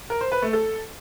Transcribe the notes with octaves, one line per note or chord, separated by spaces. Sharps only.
A#4
C5
B4
A3
A4